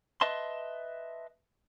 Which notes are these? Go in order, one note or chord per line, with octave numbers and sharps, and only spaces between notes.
B4 D#5 E5 A5 C6